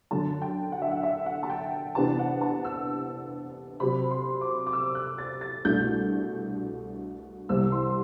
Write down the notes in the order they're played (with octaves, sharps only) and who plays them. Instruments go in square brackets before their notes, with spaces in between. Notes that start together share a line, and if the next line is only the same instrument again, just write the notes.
[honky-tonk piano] F#2 D3 F#3 A5
G5
F#5
E5
F#5
E5
F#5
A5
G5
C3 E3 B3 D4 A5
F#5
A5
E6
C3 F#3 C4 B5
C6
D6
D6
E6
F#6
A6
A6
C2 B2 A3 D4 G6
C2 C3 E3 G3 E6
C6